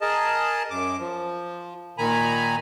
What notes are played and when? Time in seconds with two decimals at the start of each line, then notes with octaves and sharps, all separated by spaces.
0.01 G#4 A#4 D#5 A5
0.70 F#2 D6
1.00 F3
1.98 A#2 D#3 G#5 A#5 B5